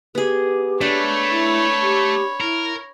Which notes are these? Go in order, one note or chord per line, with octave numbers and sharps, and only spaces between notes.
B3 G4 G#4
A3 D4 C#5 B5
E4
G4
E4 A#4